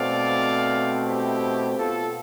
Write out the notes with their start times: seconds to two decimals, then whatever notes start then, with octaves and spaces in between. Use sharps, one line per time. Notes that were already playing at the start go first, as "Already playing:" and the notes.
Already playing: B2 A3 C4 D5 F5
1.08 E4 G4
1.77 B2 B3 F4 A4